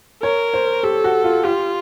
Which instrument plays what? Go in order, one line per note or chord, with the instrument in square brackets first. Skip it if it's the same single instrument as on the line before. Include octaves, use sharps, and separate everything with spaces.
[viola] A#4 [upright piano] C#5
[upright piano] C5
[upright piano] G4 [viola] A4
[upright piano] F#4
F4
[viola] F4 [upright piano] G4